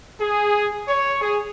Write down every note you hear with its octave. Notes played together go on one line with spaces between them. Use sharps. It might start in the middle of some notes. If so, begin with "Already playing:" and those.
G#4
C#5
G#4